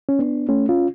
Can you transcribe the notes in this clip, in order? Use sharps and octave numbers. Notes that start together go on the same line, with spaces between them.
C#4
B3 D4
A3 C#4
C#4 F4